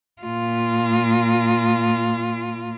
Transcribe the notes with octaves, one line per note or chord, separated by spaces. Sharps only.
A#2 F4